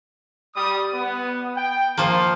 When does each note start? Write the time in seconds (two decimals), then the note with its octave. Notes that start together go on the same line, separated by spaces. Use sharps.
0.55 G3 D#6
0.94 B3
1.55 G5
1.98 F3 A#3 C6